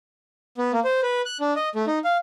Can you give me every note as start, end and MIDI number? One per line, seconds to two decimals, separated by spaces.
0.58 0.72 59
0.73 0.80 58
0.84 1.01 72
1.03 1.22 71
1.25 1.37 90
1.40 1.53 62
1.56 1.69 75
1.75 1.85 57
1.87 1.99 63
2.04 2.17 77